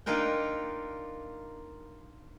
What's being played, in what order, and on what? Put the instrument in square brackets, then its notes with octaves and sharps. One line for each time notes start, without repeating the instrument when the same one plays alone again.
[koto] A#3 D4 D#4 F4 A#4 G5